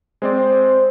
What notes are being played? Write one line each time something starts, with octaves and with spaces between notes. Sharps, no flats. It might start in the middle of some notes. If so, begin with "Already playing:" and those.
G#3 C4 C5 D5